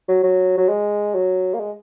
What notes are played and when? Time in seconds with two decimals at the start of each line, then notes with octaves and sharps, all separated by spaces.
0.08 F#3
0.23 F#3
0.57 F#3
0.68 G#3
1.14 F#3
1.54 A#3
1.60 G#3